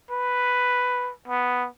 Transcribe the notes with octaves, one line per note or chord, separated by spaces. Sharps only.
B4
B3